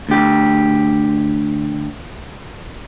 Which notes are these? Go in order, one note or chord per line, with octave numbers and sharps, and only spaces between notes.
D2 G4